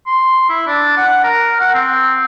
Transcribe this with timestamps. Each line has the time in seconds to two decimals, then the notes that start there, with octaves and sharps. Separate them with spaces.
0.06 C6
0.49 E4
0.67 D4
0.97 F#5
1.23 A#4
1.60 F#5
1.74 C4